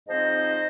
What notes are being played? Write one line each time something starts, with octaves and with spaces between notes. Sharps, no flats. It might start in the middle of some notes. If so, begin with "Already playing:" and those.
G#2 F3 C4 D#4 C5 D#5